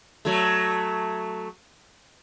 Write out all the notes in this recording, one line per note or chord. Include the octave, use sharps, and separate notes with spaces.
F#3 A3